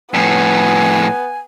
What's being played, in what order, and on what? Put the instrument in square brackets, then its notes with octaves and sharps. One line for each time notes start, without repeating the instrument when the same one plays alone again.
[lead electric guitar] F2 A2 [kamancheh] B3 [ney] G#5